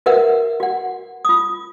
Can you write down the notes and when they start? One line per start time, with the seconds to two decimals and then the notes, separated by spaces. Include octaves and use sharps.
0.06 F#4 A#4 B4 E5 F#5
0.60 F#4 F#5
1.25 F4 D#6